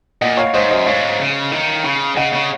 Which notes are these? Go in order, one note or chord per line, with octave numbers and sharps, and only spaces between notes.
A#2 D#5 F#5
C#5 F5
G#2 C5 D#5
F#2 C5 D#5
G#2 C#5 F5
C#3
D#3
C#3
C#3 D#5 F#5
C#3